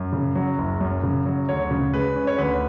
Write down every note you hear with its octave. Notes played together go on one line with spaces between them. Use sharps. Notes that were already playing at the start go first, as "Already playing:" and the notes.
Already playing: F#2
C#3
F#3
F#1
F#2
C#3
F#3
D2 C#5
C#3
G#3 B4
C#4
C#5
D2 B4